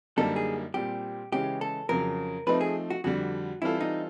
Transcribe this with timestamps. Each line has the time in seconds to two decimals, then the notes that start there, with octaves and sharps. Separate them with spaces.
0.17 F#2 D3 G3 A#3 D#4 A4
0.36 G#4
0.74 A#2 G3 C4 G4
1.32 C#3 E3 G#3 C#4 G4
1.61 A4
1.89 F2 C#3 F#3 A#4
2.47 F3 A3 C4 D#4 B4
2.61 G#4
2.90 F#4
3.04 F2 D3 G3 F#4
3.62 E3 G3 C4 E4 F4 A4
3.81 D#4